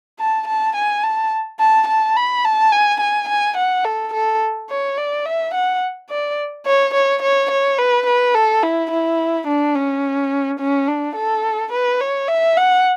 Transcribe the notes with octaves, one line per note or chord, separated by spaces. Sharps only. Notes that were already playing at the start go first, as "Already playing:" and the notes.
A5
A5
G#5
A5
A5
A5
B5
A5
G#5
G#5
G#5
F#5
A4
A4
C#5
D5
E5
F#5
D5
C#5
C#5
C#5
C#5
B4
B4
A4
E4
E4
D4
C#4
C#4
D4
A4
B4
C#5
E5
F#5